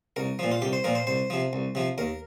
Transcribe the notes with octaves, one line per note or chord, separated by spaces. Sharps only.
C2 A#4
A#2 F3
F4
C2 G4
C5
A#2 F3 A#4
C5
C2 C5
C3 F3
C2
C3 F3
D#2 A#4